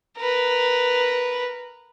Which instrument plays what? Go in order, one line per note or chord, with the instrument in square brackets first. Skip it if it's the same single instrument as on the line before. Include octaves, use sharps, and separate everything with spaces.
[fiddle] A#4 B4